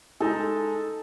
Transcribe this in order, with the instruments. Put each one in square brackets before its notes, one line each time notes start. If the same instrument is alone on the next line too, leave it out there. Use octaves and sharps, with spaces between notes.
[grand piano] G#3 D#4 [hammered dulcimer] A4